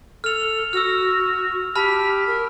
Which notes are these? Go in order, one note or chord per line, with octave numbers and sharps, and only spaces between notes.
A4 F6 F7
F#4 E6 F6
G4 A5 B5 F6
A#4